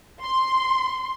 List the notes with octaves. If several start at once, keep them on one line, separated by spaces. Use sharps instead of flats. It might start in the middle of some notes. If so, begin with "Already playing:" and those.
C6